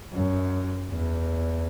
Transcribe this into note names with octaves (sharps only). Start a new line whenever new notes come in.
F#2
E2